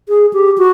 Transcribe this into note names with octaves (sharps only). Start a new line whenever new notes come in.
G#4
G4
F#4